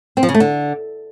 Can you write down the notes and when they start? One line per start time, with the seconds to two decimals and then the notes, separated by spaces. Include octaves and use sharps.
0.17 C4
0.23 F3
0.29 C#3
0.34 A3
0.40 D3